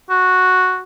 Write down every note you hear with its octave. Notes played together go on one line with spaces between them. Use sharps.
F#4